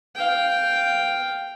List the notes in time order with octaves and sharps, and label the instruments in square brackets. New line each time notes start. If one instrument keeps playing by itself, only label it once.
[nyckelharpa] F5 G5